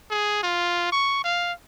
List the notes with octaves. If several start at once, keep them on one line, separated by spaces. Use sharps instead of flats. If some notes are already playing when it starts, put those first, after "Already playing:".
G#4
F4
C#6
F5